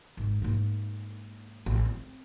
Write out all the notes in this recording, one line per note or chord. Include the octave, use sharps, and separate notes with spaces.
G#1
G#2 A#3
A1
C4